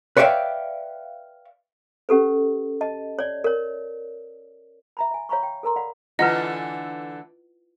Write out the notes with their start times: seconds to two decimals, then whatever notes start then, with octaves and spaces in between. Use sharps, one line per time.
0.17 B4 C#5 D5 E5 F5 G5
2.09 C#4 G4 A4 B4
2.81 D#5 A5
3.19 C#5 D5
3.44 A#4 C#5
4.97 E5 A#5 B5
5.11 E5 G#5
5.29 C#5 F5 A#5 B5 C#6
5.43 G5
5.63 A4 A#4 A#5 C6
5.76 D5 F5 F#5 B5
6.19 D3 E3 A3 E4 F4 B4 D#5 F#5